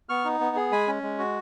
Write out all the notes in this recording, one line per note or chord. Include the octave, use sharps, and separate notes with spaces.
B3 C#6 F6
D#4
B3
G#4
G#3 G#5 B5
C#4
G#3
F#4